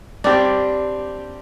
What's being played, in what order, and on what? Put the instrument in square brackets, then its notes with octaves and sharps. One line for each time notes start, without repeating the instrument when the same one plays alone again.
[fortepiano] G3 C4 G4 [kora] D4